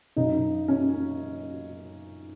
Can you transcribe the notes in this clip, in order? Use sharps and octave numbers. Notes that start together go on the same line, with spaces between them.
F#2 C#3 D#4
C#4